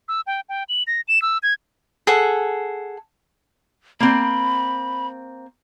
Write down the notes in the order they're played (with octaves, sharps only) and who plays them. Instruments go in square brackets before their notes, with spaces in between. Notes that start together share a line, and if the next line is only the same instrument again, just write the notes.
[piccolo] E6
G5
G5
F#7
A#6
E7
E6
G#6
[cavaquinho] G#4 A4 F#5
[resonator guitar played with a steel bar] A#3 C4 [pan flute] B5